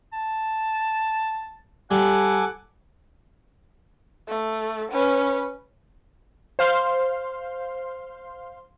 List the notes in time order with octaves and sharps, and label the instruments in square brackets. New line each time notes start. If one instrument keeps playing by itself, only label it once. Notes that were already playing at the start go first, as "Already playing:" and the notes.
[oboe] A5
[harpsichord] G3 [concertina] A4 G#5 D6 [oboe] F#5
[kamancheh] A3
C#4 B4
[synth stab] C5 F5 C6